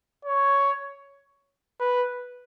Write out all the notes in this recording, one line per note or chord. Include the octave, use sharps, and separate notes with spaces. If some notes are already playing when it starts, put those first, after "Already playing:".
C#5
B4